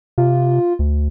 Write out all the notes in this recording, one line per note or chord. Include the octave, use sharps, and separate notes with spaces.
C3 F4
D2